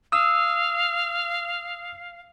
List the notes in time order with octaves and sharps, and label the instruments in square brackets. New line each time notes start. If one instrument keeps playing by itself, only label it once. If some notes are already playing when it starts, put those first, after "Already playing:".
[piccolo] F5 [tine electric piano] D#6 E6